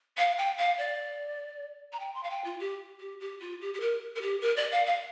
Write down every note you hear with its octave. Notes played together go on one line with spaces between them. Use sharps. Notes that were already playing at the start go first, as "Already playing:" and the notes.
F5
G5
F5
D5
A#5
G5
C6
F5
G5
F4
G4
G4
G4
F4
G4
G4
A#4
A#4
G4
A#4
D5
F5
F5